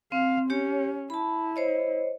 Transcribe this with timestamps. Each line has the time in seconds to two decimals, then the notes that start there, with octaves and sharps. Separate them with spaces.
0.12 C4 F5
0.50 C#4 G4 C#5
1.10 E4 A5 B5
1.56 C5 C#5 D#5